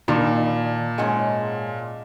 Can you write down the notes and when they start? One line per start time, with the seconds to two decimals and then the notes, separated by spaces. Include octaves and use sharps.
0.08 A#2 D#3 D#4 D5 A5 B5
0.98 G#2 G#3 C#4 F#5 G#5